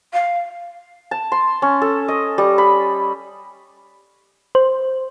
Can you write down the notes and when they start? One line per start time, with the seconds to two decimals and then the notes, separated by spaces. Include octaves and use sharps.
0.13 F5
1.11 A5
1.32 C6
1.62 C#4
1.82 A4
2.08 D#5
2.38 G3
2.58 B5
4.55 C5